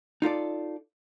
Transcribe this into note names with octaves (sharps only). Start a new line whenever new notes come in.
D#4 F4 A4 D5